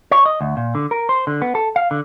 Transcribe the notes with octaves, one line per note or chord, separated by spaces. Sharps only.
C#5
D#5
D2
A#2
D3
A#4
C5
D3
B3
A4
F5
D3